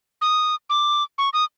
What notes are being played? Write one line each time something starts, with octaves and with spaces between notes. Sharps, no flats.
D#6
D6
C#6
D#6